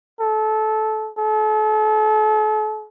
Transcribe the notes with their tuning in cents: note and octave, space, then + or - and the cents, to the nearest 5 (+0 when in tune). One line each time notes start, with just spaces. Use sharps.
A4 -20
A4 -40